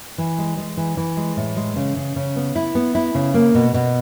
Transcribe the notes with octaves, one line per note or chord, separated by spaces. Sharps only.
E3
G#3
G#3
E3
E3
G#3
A2
G#3
C#3
C#3
C#3
B3
E4
B3
E4
C#3
A#3
B2
B2